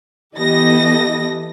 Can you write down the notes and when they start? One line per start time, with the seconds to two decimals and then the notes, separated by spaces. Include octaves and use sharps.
0.37 E3 B3 G4 A4 D#5 A#6